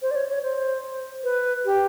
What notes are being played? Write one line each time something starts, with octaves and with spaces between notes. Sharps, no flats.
C5
D5
C#5
C#5
C5
B4
G4